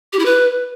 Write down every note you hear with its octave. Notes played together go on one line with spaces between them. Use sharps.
G4
E4
B4